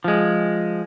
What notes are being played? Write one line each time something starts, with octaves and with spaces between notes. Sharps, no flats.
F3 G#3